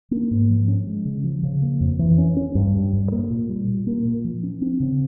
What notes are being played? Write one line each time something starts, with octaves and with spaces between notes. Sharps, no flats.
A#3
G#2
F3
C#4
G#3
C#3
F3
C#3
A#3
F2
E3
C#4
C#4
G2
G3
G2
A#3
A#2
G3
A#2
A#3
A#2
F3
C#4
C4
C#3